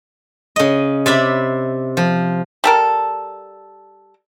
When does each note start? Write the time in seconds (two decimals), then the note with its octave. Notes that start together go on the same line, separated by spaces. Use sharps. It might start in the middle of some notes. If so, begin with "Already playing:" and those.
0.56 C#3 D#5
1.06 C3 D5 E5 B5
1.97 F3
2.64 G3 A4 A#4